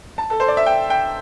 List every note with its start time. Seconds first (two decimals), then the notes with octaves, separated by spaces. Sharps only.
0.18 A5
0.30 A4
0.40 C5
0.48 D5
0.57 E5
0.66 G5
0.90 G5